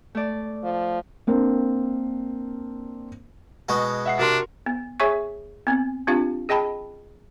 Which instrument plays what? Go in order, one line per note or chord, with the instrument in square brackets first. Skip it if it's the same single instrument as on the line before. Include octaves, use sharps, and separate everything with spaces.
[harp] A3 D5
[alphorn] F3
[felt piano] A#3 C4 D4 A#4
[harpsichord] B2 G#3 F#4
[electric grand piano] E5 F#5 C7
[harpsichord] C3 [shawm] D4 [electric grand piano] F#4 A#4 C6
[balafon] B3
G#4 C#5 E5 G#5 C#6
B3 C4
C4 D4 F4 G4 F5
G#4 D#5 G5 A5 B5